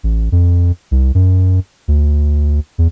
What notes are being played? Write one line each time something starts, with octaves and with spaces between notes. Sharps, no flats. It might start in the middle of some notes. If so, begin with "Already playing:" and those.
A1
F2
C2
F#2
D2
E2